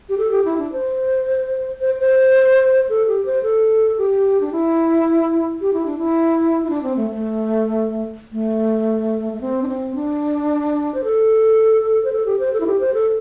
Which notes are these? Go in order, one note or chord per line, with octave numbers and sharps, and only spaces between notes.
G4
A4
G4
E4
D4
C5
C5
C5
A4
G4
C5
A4
G4
D4
E4
G4
E4
D4
E4
E4
D4
C4
A3
A3
A3
A3
C4
D4
C4
D4
C5
A4
C5
A4
G4
C5
A4
E4
G4
C5
A4